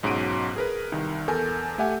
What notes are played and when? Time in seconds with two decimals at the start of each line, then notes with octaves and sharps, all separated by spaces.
0.03 B1 G#2 C#4 F#4 D7 D#7
0.56 G#4 A#4 B4
0.92 C2 D#3
1.28 E2 A4 A#4 G#5 G6
1.78 A3 G4 E5 F#5 G#5